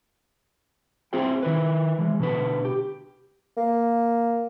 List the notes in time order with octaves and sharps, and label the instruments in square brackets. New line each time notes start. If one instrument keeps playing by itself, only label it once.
[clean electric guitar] C4 E4 F4 G#4 C5 G5
D#3 E4 B4
E3 G#3
B2 D3 B4
G4
[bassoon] A#3